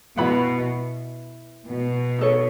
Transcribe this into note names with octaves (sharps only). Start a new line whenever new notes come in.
B2 E4 B4 F#5 B5
B2
D#4 A4 C#5